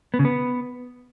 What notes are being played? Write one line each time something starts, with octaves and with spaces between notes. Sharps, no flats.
B3
C#3
B3